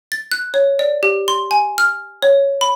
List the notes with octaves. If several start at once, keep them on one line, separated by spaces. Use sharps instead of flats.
A6
F#6
C#5
D5
G4
C6
G#5
F6
C#5
B5